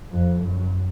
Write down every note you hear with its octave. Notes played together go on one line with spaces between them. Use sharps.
F2
F#2